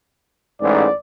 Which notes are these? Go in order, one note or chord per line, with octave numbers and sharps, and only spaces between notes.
A1 G#2 D5